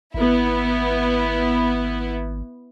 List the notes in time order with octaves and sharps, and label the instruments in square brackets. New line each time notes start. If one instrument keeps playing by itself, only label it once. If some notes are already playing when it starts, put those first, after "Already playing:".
[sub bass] G#1 [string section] B3 E4